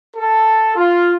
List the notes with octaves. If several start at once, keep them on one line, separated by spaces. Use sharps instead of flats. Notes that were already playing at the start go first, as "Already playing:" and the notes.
A4
F4